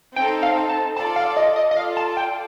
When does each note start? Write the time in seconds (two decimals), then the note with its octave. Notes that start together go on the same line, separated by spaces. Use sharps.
0.16 C4 D#4 A4 G5
0.43 F5
0.69 A5
0.96 F4 A4 D5 A5
1.16 F5
1.37 D#5
1.56 D#5
1.71 D#5
1.76 F4 A4 D5 F5
1.97 A5
2.17 G5